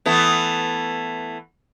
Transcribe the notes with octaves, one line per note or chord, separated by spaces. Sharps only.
E3 A3 B3